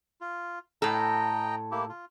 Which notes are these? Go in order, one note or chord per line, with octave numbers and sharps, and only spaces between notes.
F4
A2 A4 D#5 G5 A#5
A#3 E4 G4
F4